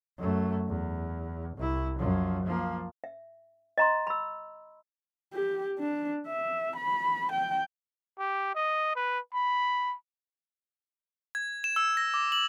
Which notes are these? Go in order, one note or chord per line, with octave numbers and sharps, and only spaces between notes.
F#2 A3
E2
C2 E4
F#2 F3
F3 A#3
E5
D#5 A#5 C6
B5 E6
G4
D4
E5
B5
G5
G4
D#5
B4
B5
G#6
E7
E6
A#6
D6
F#7